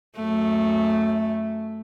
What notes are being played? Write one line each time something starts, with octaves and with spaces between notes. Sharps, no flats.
F#2 A3